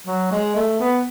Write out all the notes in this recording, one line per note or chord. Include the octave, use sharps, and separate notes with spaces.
F#3
G#3
A3
B3